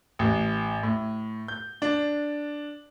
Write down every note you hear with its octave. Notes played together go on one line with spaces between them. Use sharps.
A1
A2
G6
D4